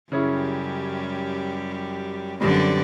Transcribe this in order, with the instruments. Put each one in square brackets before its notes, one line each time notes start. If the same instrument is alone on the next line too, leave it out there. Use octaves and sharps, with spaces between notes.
[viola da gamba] F#2 G3 G4 [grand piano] C#3 C#4 E4
[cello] F#2 D3 [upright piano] G3 [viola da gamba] C4 B4 D5